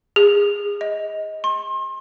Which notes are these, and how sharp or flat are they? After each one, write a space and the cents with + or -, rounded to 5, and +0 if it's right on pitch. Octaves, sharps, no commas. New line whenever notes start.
G#4 -30
D#5 +20
C6 +35